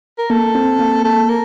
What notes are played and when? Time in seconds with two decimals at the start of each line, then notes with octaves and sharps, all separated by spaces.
0.18 A#4
0.30 A#3 A4
0.55 C4
0.79 A#3
1.05 A4
1.29 A#4